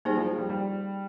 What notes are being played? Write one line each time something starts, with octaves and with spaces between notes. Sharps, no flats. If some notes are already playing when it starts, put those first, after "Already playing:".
G3 A#3 D#4 G#4 C5
F3
F3
G3
G3